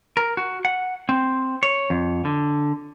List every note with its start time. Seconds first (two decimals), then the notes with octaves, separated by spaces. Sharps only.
0.17 A#4
0.37 F#4
0.65 F#5
1.09 C4
1.63 C#5
1.90 F2
2.25 D3